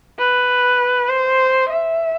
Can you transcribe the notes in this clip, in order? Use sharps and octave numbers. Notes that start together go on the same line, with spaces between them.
B4
C5
E5